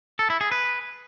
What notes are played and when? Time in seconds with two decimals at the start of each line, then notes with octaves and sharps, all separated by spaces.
0.19 A4
0.30 E4
0.41 G#4
0.52 B4